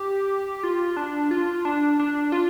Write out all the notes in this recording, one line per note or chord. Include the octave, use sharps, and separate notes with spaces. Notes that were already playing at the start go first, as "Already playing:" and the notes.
Already playing: G4
F4
D4
F4
D4
D4
F4